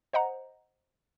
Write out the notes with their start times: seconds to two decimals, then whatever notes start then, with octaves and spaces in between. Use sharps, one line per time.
0.13 C5 D#5 F#5 A#5